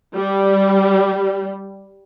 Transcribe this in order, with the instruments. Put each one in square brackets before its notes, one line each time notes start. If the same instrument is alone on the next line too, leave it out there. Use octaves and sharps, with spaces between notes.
[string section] G3